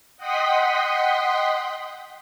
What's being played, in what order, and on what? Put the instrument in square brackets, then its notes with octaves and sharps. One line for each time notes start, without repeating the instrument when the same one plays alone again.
[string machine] D#5 F#5 G5 C6 D#6 B6